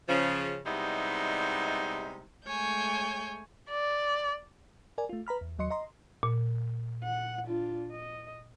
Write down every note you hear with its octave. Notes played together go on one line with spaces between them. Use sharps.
C#3 F3
C3 G3 G#3 B3 D#4 E4
G#3 A3 C#5 G#5 G6
D5
A#4 D5 G#5
A3 F4
B4 A#5 B5 F6
E2
D#2 F#3 D#5 C6 C#7
D#5 A#5 C6
A#2
F#5
D4 F4
D#5